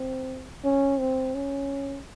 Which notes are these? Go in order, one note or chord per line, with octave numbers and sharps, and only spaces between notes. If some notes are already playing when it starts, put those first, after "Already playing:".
Already playing: C4
C#4
C4
C#4